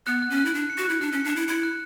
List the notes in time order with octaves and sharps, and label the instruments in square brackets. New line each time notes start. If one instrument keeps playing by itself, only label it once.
[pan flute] B3 [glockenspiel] F#6
[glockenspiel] F#6
[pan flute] C#4
[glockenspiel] F#6
[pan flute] E4
[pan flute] D4 [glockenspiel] F#6
[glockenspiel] C#7
[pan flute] F#4
[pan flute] E4 [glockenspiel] F#6
[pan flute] D4 [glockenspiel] F#6
[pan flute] C#4 [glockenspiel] C#7
[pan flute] D4
[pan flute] E4 [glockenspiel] E7
[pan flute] E4 [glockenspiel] C#7
[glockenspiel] F#6